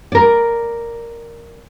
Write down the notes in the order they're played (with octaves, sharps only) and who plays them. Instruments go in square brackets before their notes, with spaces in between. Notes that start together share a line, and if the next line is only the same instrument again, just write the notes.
[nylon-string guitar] A#4 D5